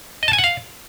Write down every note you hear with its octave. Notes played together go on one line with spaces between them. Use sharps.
D#5
A5
G#5
F#5
F5